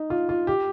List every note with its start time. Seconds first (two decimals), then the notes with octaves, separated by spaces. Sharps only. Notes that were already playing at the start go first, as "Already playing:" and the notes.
Already playing: D#4
0.10 F4
0.29 F4
0.47 G4